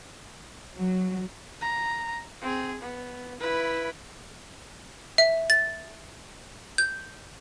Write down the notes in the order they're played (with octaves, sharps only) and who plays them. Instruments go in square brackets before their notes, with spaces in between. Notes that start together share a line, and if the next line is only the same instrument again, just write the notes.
[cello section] F#3
[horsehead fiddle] A#5
C4 G#4
B3
E4 B4
[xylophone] E5
A6
G6